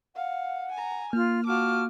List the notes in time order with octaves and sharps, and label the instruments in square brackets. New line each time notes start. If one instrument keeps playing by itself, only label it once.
[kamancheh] F5 [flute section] F#5
[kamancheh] G#5 A#5
[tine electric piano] A#3 [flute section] F4 [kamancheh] F6
[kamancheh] F4 D6 [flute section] F#4 A5 F6